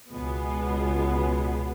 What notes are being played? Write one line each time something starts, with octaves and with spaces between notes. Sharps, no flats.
C#2 B2 G#3 B3